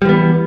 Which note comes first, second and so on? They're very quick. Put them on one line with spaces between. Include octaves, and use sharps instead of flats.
G3 E3 B3